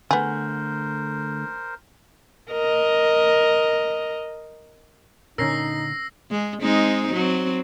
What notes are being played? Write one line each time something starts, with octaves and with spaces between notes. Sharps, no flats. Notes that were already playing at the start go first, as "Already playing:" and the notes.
D3 A3 B3 G#4 A#4 C5
A#4 D#5
A#2 D3 C#4 D#4 A#4 E6 A#6 C7
G#3
G#3 C4 D#4
F#3 C4